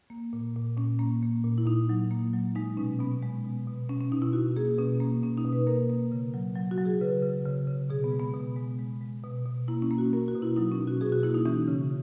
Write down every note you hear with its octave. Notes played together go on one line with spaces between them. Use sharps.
A#3
A#2
A#2
A#2 C#4
A#3
A#3
A#2
E4
A#2 D#4
F#3
A#3
F#3
G#3 D#4
B2 C#4
B2 B3
G#3
B2
B2
B2 C#4
C#4
B2 D#4
E4
B2 F#4
A#3 G#4
B2 C#4
A#3
B2 C#4
D#4
B2
B4
A#3 A#4
A#3
C#3
F#3
F#3
F#4
F#3
G#4
C#3 B4
C#3
C#3
C#3
B2 G#4
B3
G#3
B3
B2 B3
G#3
G#3
G#3
B2
B2
A#3 E4
C#4
A#3
F#4
A#3 A#4
F#4
B2
E4
F#3 D#4
C#4
B2
F#4
B2 G#4
F#4
A#3 E4
D#4
E3 C#4
C#3